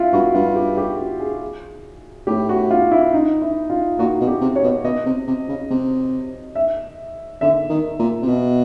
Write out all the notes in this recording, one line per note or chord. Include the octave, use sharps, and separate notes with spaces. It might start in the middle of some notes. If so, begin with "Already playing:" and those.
Already playing: E4 F4
G2 F#4
G2 F4
G4
G4
F#4
G#4
A2 G4
F#4
F4
E4
D#4
E4
F4
A#2 F#4
B2
G4
C3
C#5
B2
B2 D#5
C3
C3
C#3
C3
E5
D3 E5
D#3
A#2
C3
B2